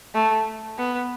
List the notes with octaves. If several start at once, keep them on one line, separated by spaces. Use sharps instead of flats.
A3
B3